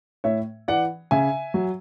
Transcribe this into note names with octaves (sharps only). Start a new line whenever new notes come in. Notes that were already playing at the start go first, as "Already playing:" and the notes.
A2 C#5 E5
E3 D5 F#5
C#3 E5 G#5
F#3